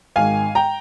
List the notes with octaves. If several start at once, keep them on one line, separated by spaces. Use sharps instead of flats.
G#1 G#2 D#3 F5 G#5
G5 A#5